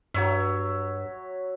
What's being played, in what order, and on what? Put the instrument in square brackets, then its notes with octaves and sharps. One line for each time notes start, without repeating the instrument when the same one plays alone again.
[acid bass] G2 [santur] F#3 C#5 E5